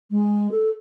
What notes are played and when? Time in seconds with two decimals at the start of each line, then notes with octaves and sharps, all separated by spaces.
0.11 G#3
0.51 A4